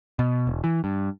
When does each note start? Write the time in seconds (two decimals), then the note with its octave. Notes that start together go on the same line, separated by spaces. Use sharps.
0.19 B2
0.47 E1
0.64 E3
0.84 G2